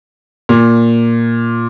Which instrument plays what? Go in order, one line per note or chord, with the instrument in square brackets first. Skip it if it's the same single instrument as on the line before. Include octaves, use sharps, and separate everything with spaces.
[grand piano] A#2